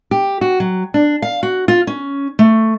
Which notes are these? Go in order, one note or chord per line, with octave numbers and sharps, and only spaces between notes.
G4
F#4
F#3
D4
F5
F#4
F4
C#4
A3